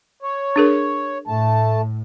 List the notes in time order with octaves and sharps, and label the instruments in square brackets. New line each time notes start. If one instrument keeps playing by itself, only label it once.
[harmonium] C#5
[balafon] D4 G#4 A#4
[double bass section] A2 [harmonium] A3 A5